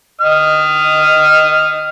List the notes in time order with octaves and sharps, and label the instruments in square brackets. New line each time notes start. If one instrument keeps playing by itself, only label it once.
[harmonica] D#5 F6